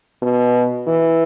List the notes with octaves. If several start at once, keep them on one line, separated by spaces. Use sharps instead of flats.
B2
E3